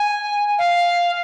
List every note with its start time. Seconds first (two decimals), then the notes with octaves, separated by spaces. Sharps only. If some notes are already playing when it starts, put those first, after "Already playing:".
Already playing: G#5
0.59 F5